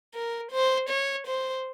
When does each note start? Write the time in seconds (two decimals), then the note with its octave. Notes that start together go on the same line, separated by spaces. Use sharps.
0.15 A#4
0.52 C5
0.89 C#5
1.27 C5